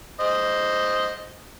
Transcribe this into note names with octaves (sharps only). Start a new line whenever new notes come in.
C5 D#5